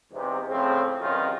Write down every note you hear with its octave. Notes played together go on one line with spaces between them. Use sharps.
E2 G#2 C3
F2 A2 C#3 F3 C4
B1 E2 C3 D#3 C#4 F4